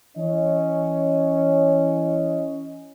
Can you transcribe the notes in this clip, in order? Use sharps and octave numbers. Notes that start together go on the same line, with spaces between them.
E3 C#4 C#5 D#5